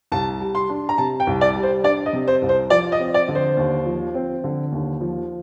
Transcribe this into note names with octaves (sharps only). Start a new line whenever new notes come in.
C2 A5
G3
C6
D4
A#5
C3 A5
G5
C2
D5
G3
C5
D4 D5
D#5
C3
C5
C2
C5
F3 D5
D#5
C4
D5
D3
C5
D#2
F3
C4
D3
D#2
F3